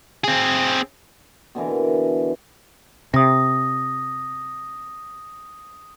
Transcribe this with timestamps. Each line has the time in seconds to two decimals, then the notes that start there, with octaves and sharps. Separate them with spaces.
0.24 C4 G#4
1.55 B2 D3 E3 A#4
3.14 C3 D#6 A#6